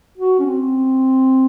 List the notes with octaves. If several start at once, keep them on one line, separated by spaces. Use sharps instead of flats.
F#4
C#4
C4